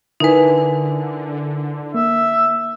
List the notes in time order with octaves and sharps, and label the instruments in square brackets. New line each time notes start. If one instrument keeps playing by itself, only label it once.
[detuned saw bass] D3 [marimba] D#4 B4 [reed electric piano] E4 A#4 G#5
[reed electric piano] A#3 [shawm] E5